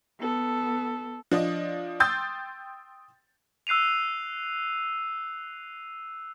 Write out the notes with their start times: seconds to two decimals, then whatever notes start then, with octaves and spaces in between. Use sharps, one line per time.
0.19 B3 A4
1.31 F3 D4 D#5
2.00 G5 C6 D#6 E6 G6 A6
3.67 E6 F#6 C7 D#7 F7